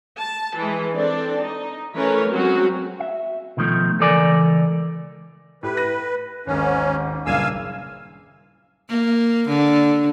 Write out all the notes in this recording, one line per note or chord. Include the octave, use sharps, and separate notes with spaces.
A5
E3 G#3
C4 D4 A4 D5
D#4
E3 A3 C#4 A#4 B4 C#5
F#3 G#3 C4 C#4 F#4
E5
B2 D#3 F3 A3
C#2 E3 A4 A#4 D5 G#5
A2 G4 B4
F#6 A#6 D#7
G#1 D#2 G#2 C#4
F#1 G2 A#2 F5 G#5 E6
A#3
D3